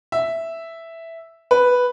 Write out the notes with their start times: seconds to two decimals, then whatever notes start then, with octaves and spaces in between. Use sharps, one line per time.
0.12 E5
1.51 B4